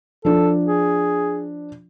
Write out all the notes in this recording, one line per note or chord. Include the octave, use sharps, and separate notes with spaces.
F3 D4 A4
G#4